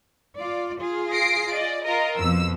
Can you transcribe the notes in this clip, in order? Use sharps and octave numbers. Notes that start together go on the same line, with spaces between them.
F4 D5
F4 G#4
A#6 C7 D7
D5 D#5
F4 A#4 D#5
F2 B2 F3 E6